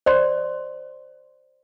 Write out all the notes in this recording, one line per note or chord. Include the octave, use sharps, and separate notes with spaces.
C5 D5 C6